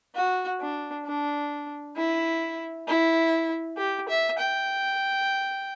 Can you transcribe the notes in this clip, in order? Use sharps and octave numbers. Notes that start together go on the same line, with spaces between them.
F#4
D4
D4
E4
E4
G4
E5
G5